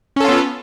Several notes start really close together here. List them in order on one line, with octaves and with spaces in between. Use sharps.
C#4 A4 F4 B3